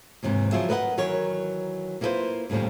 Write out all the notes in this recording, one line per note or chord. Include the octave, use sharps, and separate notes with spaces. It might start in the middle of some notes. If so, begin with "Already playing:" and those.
D#2 G#2 C3 E3
C#3 F3 F#3 F4 G#4 E5
A#4 B4 D#5 F5 F#5
D#3 E3 F#3 A#4 C#5
A#3 E4 F4 G#4 B4 C5
D#2 A2 C#3 F3 G3